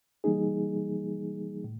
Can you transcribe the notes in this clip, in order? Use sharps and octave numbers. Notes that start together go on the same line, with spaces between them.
E3 G3 A#3 D#4 G#4
A2